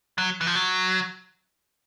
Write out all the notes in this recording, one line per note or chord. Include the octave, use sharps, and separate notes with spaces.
F#3
E3
F3
F#3